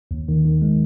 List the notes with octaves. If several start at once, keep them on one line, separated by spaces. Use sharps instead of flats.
D#2
D#3
D#3
G#3